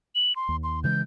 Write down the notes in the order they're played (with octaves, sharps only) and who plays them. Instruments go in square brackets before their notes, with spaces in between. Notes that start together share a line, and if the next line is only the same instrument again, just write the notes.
[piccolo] F#7
C6
[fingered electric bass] D#2
[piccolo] C6
[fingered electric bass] C#3 E3 G#3 [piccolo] G6